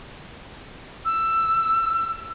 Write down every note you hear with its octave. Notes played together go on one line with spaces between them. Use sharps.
E6